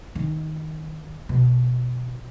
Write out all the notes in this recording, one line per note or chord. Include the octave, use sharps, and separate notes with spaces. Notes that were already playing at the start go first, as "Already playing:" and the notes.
D#3
B2